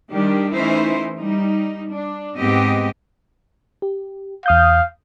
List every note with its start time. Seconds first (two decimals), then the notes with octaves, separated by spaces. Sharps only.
0.12 D#3 G3 D4 G4
0.53 E3 A3 C#4 D#4 E4 C5
1.18 G3 D#4
1.93 D4
2.38 G#2 B3 C4 G4 D#5
3.82 G4
4.46 E2 F5 D#6 G6